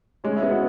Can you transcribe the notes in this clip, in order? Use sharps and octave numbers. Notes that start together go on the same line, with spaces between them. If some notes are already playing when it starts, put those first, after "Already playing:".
G#3 C#4 C#5
E4 E5
B3
F#4 F#5